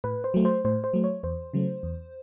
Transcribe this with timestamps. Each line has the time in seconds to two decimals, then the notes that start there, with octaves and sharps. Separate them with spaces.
0.04 A2 B4
0.24 C5
0.34 F#3 A3
0.45 C5
0.65 A2 C5
0.84 C5
0.93 F#3 A3
1.04 C#5
1.23 E2 C5
1.54 C#3 F#3 A3
1.83 E2